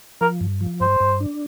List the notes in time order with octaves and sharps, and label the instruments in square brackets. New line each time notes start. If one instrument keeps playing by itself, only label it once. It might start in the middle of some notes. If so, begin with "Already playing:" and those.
[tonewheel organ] F3 [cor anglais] A#4
[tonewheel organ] G2
F3
[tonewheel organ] G2 [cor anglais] C5
[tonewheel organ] G2
D4